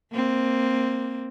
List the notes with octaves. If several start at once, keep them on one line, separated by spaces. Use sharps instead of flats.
A#3 C4